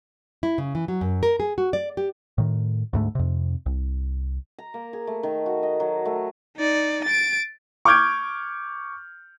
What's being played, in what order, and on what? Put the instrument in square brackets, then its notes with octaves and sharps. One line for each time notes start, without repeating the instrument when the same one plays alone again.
[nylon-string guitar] E4
C#3
E3
F#3
F#2
A#4
G#4
F#4
D5
G4
[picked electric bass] A2 D#3
D2 G#2 A3
F2 C3
C2
[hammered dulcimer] A#5
A#3
G#4
A3
D#3
F#4
D#5
F#3
A3
[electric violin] D#4 D5
A6 D7
[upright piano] C#6 D6 F6 G6 G#6 D7